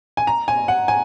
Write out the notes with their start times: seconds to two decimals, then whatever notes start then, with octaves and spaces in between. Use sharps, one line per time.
0.17 G#5
0.27 A#5
0.48 G#5
0.68 F#5
0.88 G#5